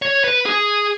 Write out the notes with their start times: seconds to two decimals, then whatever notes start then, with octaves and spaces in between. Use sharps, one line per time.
0.02 C#5
0.24 B4
0.46 G#4